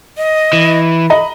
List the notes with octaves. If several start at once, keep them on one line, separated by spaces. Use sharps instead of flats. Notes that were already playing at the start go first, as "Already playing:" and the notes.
D#5
E3
D#5 A#5 B5